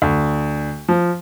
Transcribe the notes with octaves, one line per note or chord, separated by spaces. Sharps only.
D2
F3